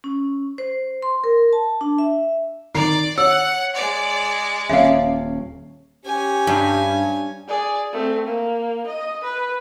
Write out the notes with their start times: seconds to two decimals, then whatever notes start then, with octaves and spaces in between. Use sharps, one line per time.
0.04 C#4
0.58 C5
1.02 C6
1.24 A#4
1.53 A5
1.81 D4
1.98 E5
2.75 D#3 D5 A#5 C7
3.18 C#5 F#5 E6
3.75 G#3 D5
4.70 D#1 C#4 E5 F5 C7
6.06 C#4 G4 G#5
6.47 G2 D4
7.48 G#4 D5
7.93 A3 C4
8.27 A#3
8.87 D#5
9.23 B4